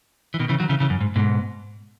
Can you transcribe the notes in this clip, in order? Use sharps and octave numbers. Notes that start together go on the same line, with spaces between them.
E3
B2 D#3
C#3 E3
D#3 F#3
C#3 E3
C#3 E3
F#2
G#2
G#2 B2